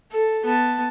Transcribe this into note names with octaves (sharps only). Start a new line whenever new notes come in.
A4
B3 A5